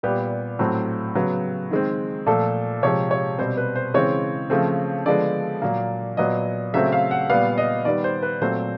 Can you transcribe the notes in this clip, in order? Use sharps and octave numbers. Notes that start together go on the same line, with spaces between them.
A#2 G3 B3 G4
A2 F#3 A3 C4
C#3 F#3 B3
D#3 G#3 C4
A#2 F3 A3 A4
C3 F3 G#3 C#5
C#5
B2 G3 C4 C5
B4
C5
C#3 E3 G#3 C4 C#5
C#3 F3 A3 C4
D3 F3 G#3 B3 D5
A#2 F#3 A#3
A#2 F#3 B3 D#5
C#3 F#3 A3 C4 E5
F5
F#5
A#2 G3 B3 F5
D#5
D#3 G3 B3 D5
C5
B4
A#2 F#3 A3 C4 C5